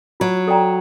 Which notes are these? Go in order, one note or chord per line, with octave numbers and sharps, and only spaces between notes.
F#3 F4
A4 D5 G5 A#5